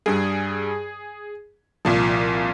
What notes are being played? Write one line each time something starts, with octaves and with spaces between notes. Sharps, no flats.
G2 G3 G#4
C2 A#2 F3